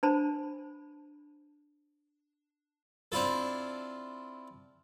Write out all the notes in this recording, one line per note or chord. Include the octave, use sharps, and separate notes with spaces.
D4 C5 A5 B5
C4 D4 E4 F4 A4